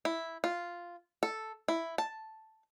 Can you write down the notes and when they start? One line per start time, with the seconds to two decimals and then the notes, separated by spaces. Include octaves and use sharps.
0.05 E4
0.44 F4
1.23 A4
1.68 E4
1.98 A5